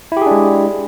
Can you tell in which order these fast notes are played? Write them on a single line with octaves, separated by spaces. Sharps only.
E4 G4 G#4 D4 G#3